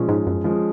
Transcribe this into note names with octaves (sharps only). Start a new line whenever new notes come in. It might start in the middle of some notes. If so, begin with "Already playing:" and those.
Already playing: A#2 F3 G#3 C#4
G#2
F#2
F3 G#3 C#4